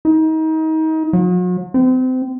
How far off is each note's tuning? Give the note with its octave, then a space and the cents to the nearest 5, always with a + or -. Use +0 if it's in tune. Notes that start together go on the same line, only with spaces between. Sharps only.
D#4 +30
F#3 -45
C4 -30